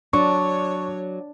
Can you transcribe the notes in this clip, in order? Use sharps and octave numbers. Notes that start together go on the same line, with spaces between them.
F#3 D4 C#5 D5 C#6